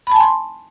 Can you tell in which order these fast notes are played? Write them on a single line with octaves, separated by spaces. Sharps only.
B5 A5 G#5 C6